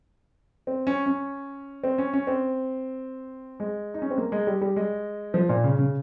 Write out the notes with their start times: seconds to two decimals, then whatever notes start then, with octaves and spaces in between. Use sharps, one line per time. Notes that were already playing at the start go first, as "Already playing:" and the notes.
0.67 C4
0.87 C#4
1.06 C#4
1.84 C4
1.98 C#4
2.13 C#4
2.27 C4
3.60 G#3
3.94 D#4
4.02 C#4
4.10 C4
4.18 A#3
4.32 G#3
4.47 G3
4.61 G3
4.76 G#3
5.34 F3
5.49 A#2
5.64 C#3
5.79 C#3